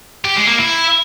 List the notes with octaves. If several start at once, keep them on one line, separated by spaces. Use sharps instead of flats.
G4
G#3
A#3
E4